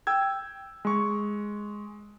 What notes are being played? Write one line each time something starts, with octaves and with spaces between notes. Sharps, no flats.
G5 E6 G#6
G#3 C#6